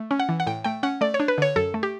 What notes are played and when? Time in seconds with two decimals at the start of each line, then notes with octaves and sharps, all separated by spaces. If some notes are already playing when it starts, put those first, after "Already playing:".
Already playing: A3
0.11 C#4
0.20 F#5
0.29 E3
0.40 F#5
0.47 A2 G5
0.64 A3 G5
0.83 C#4 F#5
1.01 A3 D5
1.14 C#5
1.20 D4
1.28 B4
1.38 D3 C#5
1.56 F#2 A4
1.74 A3
1.83 G4